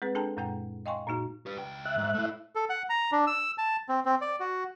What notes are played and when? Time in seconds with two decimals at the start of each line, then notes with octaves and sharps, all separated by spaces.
0.02 G#3 C4 G#4 B4
0.15 D4 G#4 A4 G5 A5 A#5
0.37 F#2 A#2 G#3 F#5 G5 A#5
0.86 D#5 F5 G5 G#5 C6 C#6
1.07 A#2 A#3 D#4 F#4 A#5
1.46 G4 B4
1.57 C#2 G5
1.85 E5 F#6
1.98 G#2
2.14 A3 E4
2.55 A4
2.70 F#5
2.90 A#5
3.12 D4
3.27 E6
3.58 A5
3.89 C4
4.05 C4
4.21 D5
4.40 F#4